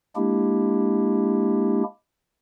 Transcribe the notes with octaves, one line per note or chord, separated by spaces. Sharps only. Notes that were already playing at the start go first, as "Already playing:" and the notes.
G#3 A#3 D4 E4 G4